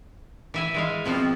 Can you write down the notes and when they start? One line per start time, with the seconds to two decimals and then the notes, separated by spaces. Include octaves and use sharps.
0.54 E3 E5 G#5
0.74 E3 G#3 F5
1.05 B2 F3 C4 F4